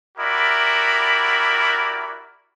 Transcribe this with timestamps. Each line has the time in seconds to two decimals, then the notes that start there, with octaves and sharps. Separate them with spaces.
0.18 E4 F#4 G4 A#4 D5 B5